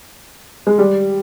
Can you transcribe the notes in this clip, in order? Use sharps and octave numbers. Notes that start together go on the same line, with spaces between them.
G#3
G3